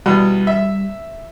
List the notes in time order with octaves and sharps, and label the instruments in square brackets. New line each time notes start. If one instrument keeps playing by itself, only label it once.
[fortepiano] E2 B2 [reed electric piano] G3
[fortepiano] E5